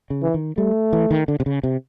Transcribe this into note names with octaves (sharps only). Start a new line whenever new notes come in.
C#3
E3
D#3
G3 A3
E3
D#3
D3
C3
C#3
C3